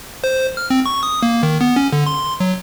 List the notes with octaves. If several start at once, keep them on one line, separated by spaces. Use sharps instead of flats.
C5
F6
C4
C#6
D#6
A#3
D#3
B3
C#4
D3
C6
F#3